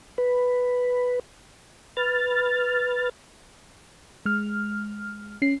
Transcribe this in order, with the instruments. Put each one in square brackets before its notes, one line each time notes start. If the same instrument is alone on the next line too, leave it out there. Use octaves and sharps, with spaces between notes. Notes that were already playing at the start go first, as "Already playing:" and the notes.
[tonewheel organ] B4
B4 F6 A6
[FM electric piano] G#3 F6
C#4 C7